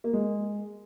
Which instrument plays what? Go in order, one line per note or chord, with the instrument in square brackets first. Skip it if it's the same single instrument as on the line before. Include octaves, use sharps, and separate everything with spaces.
[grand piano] A#3
G#3